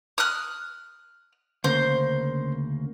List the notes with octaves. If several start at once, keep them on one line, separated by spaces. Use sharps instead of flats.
D#6 F6 F#6
D2 C#3 A#3 C5